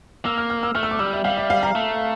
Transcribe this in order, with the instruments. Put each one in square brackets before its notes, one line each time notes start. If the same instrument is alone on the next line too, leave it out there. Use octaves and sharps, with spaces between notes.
[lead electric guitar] A#3 [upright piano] E6
[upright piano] F6
F6
E6
[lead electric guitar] A3 [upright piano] F6
[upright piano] E6
D6
[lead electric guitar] G3 [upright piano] E6
[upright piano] E5
[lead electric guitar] G3 [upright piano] F5
[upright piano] E5
F5
A#5
[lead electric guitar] A3